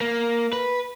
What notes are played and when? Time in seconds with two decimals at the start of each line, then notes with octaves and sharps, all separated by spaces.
0.01 A#3
0.53 B4